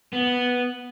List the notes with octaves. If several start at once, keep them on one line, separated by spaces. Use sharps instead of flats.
B3